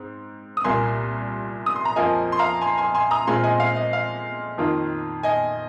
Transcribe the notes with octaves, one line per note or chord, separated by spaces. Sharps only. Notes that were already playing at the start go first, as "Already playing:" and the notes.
Already playing: G#2 C4
D#6
C2 A#2 A#3 G#5 C6
D#6
C6
A#5
F2 F3 A#3 F4 D#5 G#5
C6
F5 A#5
G#5 C6
G#5 C6
G#5 C6
A#5 D#6
A#2 G#3 C4 F4 G#5 C6
D#5 G#5
F5
D#5
F5
F2 D#3 A#3 F4
D#5 G#5